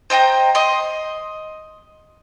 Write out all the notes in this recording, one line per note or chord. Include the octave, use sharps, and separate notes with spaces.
C5 D#5 G5 A#5
D#5 C6